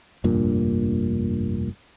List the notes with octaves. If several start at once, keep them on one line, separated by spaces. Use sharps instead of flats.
F1 A#1 G2 A#2